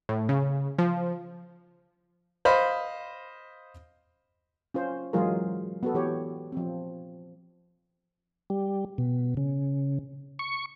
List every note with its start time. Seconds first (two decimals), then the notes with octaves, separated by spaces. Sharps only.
0.09 A2
0.29 C#3
0.78 F3
2.45 C5 D#5 F5 B5
4.74 C#4 F4 C5
5.13 E3 F#3 G#3 F4 G#4 A#4
5.83 B3 F#4 A4
5.95 E3 G4 C#5
6.52 F3 C4
8.50 G3
8.98 B2
9.37 C#3
10.39 C#6